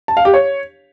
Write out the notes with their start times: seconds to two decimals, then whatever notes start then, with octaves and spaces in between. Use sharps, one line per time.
0.08 A5
0.17 F5
0.25 G4
0.34 C#5